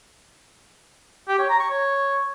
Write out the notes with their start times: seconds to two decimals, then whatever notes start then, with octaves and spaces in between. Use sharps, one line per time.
1.28 G4
1.39 C#5
1.49 A#5
1.60 C#6
1.70 C#5